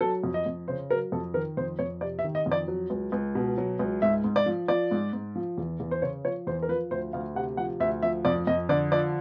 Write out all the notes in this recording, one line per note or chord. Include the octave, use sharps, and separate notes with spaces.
F#3 A4
F2
D#5
F2
C#3 C5
F#3 A#4
F2 A4
D#3 A#4
F2 C5
F2 C#5
C3 D5
E5
D#3
D#5
F2
D5
F#3
C#2
C#2
B2
F#3
C#2
G#2 E5
G#2
D5
F3
F3 D5
G#2
G#2
F3
E2
E2
C5
C#3 C#5
F3 C#5
E2 C5
A#4
F3 B4
D2 C5
D2 F5
C3 F#5
F3 F#5
D2 E5
F3 E5
F2 D5
F2 D#5
D3 D5
F3 D5